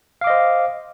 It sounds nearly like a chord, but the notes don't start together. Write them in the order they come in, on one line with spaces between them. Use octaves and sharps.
F5 D6 D#5 C5